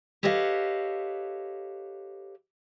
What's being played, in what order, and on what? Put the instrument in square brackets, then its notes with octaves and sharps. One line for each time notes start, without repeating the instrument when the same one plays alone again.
[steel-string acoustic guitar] G4 A4 B4 C#5 D#5 F5